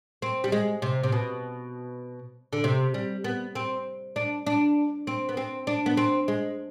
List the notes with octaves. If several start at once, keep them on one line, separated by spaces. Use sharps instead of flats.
C4
G3
G#3
C3
C3
B2
D3
C3
G3
B3
C4
D4
D4
C4
B3
C4
D4
B3
C4
G#3